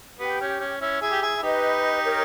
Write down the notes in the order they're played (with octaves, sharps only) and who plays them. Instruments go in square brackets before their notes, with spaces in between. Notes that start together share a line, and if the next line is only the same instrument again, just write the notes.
[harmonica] B3 [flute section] G4
[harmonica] C#4
C#4
C#4 E4
E4 G#4
G4
E4 G#4
E4
[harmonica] D#4 G4 [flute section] B4 D#5
[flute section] A#4 C#5